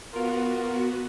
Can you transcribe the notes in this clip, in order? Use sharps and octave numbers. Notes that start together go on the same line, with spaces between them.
B3 F4 F#4 A#4